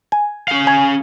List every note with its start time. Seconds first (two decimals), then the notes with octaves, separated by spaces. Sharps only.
0.12 G#5
0.48 C#4 F5
0.67 G#5